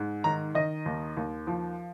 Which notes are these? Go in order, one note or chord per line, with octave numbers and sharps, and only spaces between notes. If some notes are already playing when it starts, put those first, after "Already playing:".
Already playing: G#2
D#3 A#5
D#3 D#5
D#2
D#2
F3